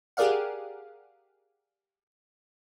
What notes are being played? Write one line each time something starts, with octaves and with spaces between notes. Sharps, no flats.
G4 G#4 A#4 D5 F5 F#5